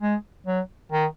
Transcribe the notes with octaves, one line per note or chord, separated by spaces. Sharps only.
G#3
F#3
D#3